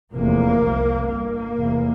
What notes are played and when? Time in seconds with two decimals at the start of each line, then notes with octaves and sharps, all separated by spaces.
0.13 F1 E2 C3 A#3
0.60 C2 C3
1.08 G1 G2 A#3
1.56 F1 E2 C3